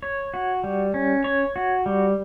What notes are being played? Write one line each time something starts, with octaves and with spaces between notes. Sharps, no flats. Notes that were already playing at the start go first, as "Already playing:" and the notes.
C#5
F#4
G3
C#4
C#5
F#4
G3